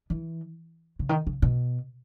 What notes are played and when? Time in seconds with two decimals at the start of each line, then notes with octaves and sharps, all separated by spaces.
0.10 E3
0.99 C#3
1.09 D#3
1.27 C#3
1.42 B2